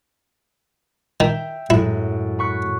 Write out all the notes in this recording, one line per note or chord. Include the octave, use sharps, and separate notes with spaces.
D#3 E5 G5
F#2 A2 G#3 E4
B5 C#6 F#6